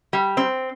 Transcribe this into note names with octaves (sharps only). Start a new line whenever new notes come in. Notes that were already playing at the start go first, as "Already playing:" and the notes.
G3
C4